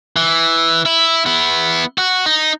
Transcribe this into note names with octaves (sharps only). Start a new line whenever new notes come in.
E3
E4
B3 E4
F#4
D#4